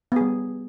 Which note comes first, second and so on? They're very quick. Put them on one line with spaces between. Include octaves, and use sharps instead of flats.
B3 G#4 G3